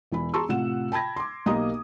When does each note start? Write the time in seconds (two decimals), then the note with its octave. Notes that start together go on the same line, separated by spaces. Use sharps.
0.12 E1 E3 E4 B5
0.34 G#4 A5 A#5 C6 C#6 E6
0.49 A2 C3 F4 F#5 E7
0.92 G5 A5 B5 G#6 A#6
1.16 C6 D6
1.46 B1 A#3 G4 D#5 A#5 D#6